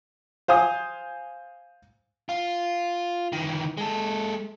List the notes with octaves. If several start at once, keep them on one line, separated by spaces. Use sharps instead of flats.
C5 F5 G#5 D#6
F4
D#3 E3
G#3 A4